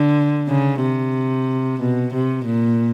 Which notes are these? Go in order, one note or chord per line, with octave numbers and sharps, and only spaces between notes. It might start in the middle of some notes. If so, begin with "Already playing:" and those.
Already playing: D3
C#3
C3
B2
C3
A#2